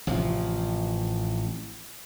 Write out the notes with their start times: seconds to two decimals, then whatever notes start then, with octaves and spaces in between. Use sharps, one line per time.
0.07 A1 C3 F3